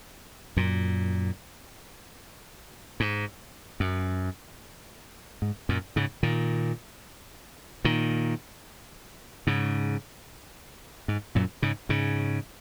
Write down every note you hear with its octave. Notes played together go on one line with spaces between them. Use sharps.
F#2 A#2
G#2
F#2
G#2
F#2 A#2
G#2 C#3
A#2 D#3
A#2 D#3
G#2 C#3
G#2
F#2 A#2
G#2 C#3
G#2 C#3